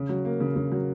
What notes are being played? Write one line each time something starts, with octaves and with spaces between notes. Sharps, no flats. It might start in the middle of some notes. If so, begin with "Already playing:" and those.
Already playing: C#3
F#3
A#3
C#3
C#3
F#3